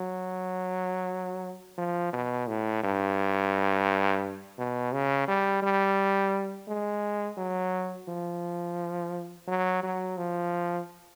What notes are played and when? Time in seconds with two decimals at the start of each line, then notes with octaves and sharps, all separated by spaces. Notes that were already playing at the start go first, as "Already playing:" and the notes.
Already playing: F#3
1.78 F3
2.13 B2
2.48 A2
2.84 G2
4.58 B2
4.93 C#3
5.28 G3
5.63 G3
6.68 G#3
7.38 F#3
8.08 F3
9.48 F#3
9.83 F#3
10.18 F3